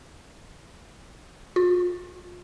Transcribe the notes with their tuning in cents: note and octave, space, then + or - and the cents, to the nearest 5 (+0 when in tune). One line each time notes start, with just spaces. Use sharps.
F4 +35